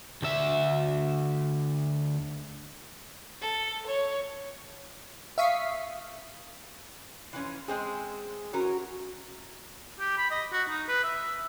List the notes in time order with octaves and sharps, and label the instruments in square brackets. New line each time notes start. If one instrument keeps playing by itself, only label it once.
[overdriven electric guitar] D2 E5
[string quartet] A4
C#5
[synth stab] E5 F5 C#6 D#6 B6 C7
[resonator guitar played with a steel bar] E3 F3 C#4
G#3 C4 G#4
[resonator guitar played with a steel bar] E3 C#4 A#4 [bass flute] F#4
[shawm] G4
B5
D#5
F#4
D#4
B4
E5